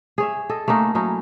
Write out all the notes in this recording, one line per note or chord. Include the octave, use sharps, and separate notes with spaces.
G#4 C#5 E5
A4 D#5
A3 A#3 C#4 D#4
F#3 C#4 D#4 E4